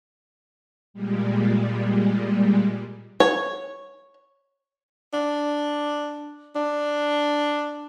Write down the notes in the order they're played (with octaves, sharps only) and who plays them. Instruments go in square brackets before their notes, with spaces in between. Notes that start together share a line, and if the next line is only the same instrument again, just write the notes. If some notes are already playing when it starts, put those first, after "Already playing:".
[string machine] A#2 G3 G#3
[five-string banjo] C#5
[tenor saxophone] D4
D4